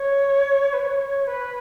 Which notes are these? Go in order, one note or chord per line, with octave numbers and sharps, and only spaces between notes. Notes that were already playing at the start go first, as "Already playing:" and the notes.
Already playing: C#5
B4
C#5
B4